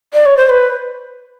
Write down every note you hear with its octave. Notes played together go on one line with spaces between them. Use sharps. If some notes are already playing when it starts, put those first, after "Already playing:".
D5
C#5
C5
B4